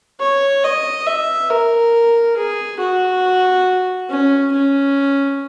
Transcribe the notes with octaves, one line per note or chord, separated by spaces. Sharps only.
C#5
D#5
E5
A#4
G#4
F#4
C#4
C#4